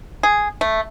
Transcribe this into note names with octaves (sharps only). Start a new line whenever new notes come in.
G#4
A3